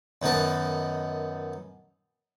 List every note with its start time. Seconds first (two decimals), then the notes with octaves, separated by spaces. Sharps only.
0.22 F#2 D#3 B3 A#4 A5